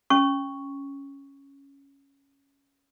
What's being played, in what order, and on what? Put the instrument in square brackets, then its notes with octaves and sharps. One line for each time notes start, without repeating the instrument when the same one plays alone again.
[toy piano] C#4 C#6